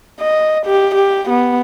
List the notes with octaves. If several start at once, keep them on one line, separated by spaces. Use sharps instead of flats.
D#5
G4
G4
B3